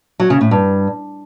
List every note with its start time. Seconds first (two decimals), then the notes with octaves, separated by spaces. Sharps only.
0.20 F#3
0.30 C#3
0.41 A2
0.51 G2